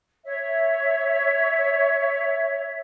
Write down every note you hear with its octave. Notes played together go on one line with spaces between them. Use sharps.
C#5 E5